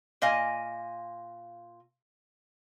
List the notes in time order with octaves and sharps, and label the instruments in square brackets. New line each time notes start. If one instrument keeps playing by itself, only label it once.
[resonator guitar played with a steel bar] A#2 D#5 F5 G#5